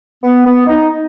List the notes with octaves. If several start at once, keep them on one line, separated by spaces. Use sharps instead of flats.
B3
B3
D#4